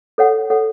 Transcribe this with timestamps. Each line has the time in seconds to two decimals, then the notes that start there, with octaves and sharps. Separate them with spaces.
0.18 A4 C#5 F#5
0.50 A4 C#5 F#5